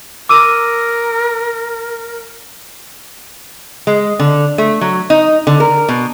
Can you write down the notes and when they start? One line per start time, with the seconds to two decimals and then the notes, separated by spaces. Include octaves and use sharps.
0.29 A#4 D6 E6 D#7
3.87 G#3
4.19 D3
4.58 A3
4.81 F#3
5.10 D#4
5.47 D3
5.60 A#4
5.89 B2